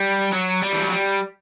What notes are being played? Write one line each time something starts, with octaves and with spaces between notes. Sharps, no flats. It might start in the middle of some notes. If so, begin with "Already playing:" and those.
Already playing: G3
F#3
G3
E3
F#3
G3